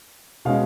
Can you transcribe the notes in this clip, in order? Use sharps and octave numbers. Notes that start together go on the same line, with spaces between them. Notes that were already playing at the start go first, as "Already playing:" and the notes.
B2 G#3 C#4 F5